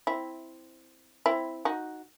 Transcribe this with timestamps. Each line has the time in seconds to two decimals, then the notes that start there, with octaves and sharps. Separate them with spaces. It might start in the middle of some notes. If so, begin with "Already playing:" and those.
0.07 C4 E4
1.26 C4 E4
1.65 D#4 F#4